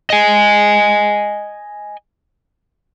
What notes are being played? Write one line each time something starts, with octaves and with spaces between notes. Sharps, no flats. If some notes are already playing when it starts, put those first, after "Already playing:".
D#5 G#5